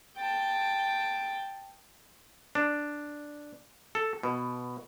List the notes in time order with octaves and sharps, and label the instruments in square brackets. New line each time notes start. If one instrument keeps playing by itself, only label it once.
[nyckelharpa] G5 A5
[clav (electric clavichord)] D4
A4
B2